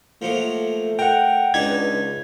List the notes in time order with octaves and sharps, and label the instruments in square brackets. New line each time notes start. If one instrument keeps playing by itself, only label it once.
[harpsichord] F3 F#3 A#3 [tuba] A3
[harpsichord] A#4 [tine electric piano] F#5 G5
[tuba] C#2 [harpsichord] D4 D#4 B4 [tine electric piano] G#6